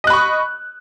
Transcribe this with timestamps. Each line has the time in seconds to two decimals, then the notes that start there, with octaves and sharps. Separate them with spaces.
0.04 D#5
0.07 F#6
0.10 B5
0.13 C#6